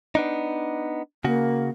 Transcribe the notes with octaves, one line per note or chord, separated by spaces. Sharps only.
B3 D4 D#4
C#3 A#3 F#4